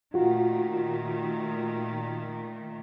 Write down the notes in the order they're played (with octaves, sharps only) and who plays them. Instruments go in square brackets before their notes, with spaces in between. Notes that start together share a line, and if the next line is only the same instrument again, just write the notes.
[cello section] A#2 D#3 A3 [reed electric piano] F4 F#4